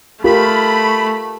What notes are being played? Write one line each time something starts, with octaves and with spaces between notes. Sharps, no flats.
A3 F4 G4 A#4 B5